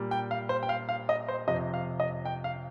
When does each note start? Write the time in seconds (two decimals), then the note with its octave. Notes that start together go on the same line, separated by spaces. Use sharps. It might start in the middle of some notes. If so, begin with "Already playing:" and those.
Already playing: A#2 G3
0.11 G5
0.31 F5
0.49 C5
0.63 G5
0.69 F5
0.89 F5
1.09 D#5
1.28 C5
1.47 F2 C3 F3 D#5
1.74 F5
2.00 D#5
2.25 G5
2.44 F5